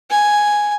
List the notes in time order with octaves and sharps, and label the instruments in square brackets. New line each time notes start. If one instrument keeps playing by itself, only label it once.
[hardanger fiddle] G#5